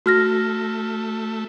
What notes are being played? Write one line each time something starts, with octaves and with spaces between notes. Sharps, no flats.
A3 F#4 F6 A#6